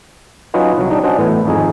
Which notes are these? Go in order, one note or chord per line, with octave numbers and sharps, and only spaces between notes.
F#3 C#4 D#4 F4 B4 D#5
C2 F#3
G3 D4 D#4
C#4 D4 F#4 C5 D#5
A2 E3 B3
G#1 F2 D#4 G#4